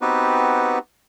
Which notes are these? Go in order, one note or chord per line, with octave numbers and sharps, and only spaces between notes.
B3 C4 D#4 F#4 G4 B4